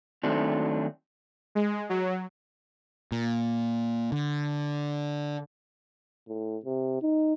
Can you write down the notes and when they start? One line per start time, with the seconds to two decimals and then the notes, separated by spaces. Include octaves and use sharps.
0.23 D#3 F#3 A3 C4 D4 D#4
1.55 G#3
1.89 F#3
3.12 A#2
4.12 D3
6.28 A2
6.65 C3
7.03 D#4